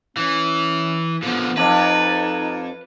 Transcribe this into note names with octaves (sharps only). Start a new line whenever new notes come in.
E3 C#4
D3 F3 B3
F2 D#4 B4